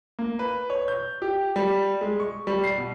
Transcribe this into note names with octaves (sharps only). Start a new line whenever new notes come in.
A#3
B4
C#5
G6
G4
G3
G#3
C#6
G3
C7
B2